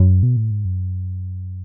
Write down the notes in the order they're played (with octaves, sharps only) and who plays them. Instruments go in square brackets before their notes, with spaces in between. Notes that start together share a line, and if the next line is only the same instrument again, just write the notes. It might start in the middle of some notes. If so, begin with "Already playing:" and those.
Already playing: [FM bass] F#2
B2
A2
G#2
F#2